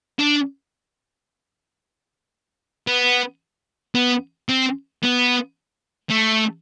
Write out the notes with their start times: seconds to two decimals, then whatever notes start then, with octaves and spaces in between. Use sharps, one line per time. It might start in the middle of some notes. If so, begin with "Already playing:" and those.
0.19 D4
2.87 B3
3.95 B3
4.49 C4
5.03 B3
6.10 A3